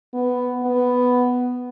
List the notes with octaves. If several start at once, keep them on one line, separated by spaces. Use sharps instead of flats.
B3
B3